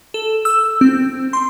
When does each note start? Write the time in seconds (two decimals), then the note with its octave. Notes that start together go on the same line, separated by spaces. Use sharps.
0.14 A4
0.45 E6
0.81 C4
1.33 C6